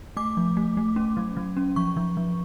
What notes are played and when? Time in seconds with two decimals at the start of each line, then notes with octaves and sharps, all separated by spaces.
0.17 A3 D6
0.37 F3
0.57 A3
0.77 A3
0.96 C#4
1.17 F#3
1.37 F#3
1.57 C#4
1.76 F3 C#6
1.97 F3
2.17 F3